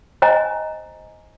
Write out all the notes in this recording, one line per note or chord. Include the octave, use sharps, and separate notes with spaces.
C5 D#5 G#5 A#5